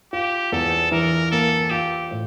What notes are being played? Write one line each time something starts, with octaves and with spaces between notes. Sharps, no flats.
F4 G4
E2 A4
E3 A#4
A#3 A4
F4 G4
A2